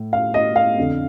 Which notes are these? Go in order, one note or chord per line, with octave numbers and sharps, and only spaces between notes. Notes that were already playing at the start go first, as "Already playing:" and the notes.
Already playing: A2
F5
D#5
F5
F2 D3